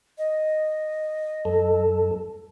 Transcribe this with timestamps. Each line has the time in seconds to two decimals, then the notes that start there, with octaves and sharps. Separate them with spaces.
0.18 D#5
1.45 F#2 A4